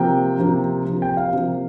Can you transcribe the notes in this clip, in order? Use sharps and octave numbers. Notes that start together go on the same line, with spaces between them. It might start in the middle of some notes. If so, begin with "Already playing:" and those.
Already playing: C3 F3 A#3 G5
C3 F3 A#3
C3 F3 A#3
G5
F5
C3 F3 A#3